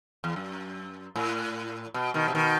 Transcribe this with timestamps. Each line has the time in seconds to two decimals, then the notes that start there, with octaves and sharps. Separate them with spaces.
0.24 E2
0.36 F#2
1.16 A2
1.94 B2
2.14 B2 D#3
2.28 C3
2.35 B2 D#3